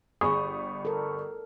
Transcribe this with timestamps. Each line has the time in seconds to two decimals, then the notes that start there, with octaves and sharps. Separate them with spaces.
0.21 G1 G#4 B5 C#6 D#6
0.85 A4 A#4